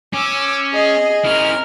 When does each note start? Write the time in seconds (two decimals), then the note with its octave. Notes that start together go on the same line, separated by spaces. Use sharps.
0.14 C#4 D6 E6
0.74 G#4 D#5
1.25 C#4 E4 A#4 F6